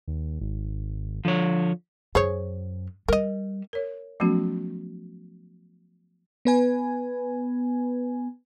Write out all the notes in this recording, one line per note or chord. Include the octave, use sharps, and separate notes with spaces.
D#2
G#1
D3 F3 C#5
F#2 G#4 C5 C#5
G3 A#4 D#5
A#4 C#5
F3 F#3 A3 B3 C#4 F#4
B3 B4 G#5